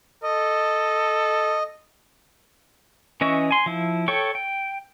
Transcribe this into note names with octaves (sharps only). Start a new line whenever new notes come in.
A4 D#5
E3 C#4 D#5 E5 C#6
G#5 C6
F3 E4
A4 C#5 G5 C#6
G5